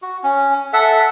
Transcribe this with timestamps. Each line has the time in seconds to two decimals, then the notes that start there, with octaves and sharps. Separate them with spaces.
0.02 F#4
0.23 C#4
0.73 A4 E5 F#5